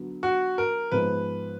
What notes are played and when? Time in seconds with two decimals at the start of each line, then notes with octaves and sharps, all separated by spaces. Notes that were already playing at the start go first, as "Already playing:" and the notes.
Already playing: D3 F#3 B3
0.23 F#4
0.58 A#4
0.92 G#2 F3 G#3 B3 B4